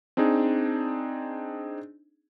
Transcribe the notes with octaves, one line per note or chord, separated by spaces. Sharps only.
C4 D4 D#4 G#4